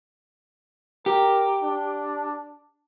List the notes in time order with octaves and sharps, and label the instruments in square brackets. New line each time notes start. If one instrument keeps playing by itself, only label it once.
[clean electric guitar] G4 [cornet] A#4
[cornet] D4